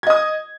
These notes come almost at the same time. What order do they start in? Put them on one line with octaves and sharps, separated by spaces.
G#6 D#5 D#6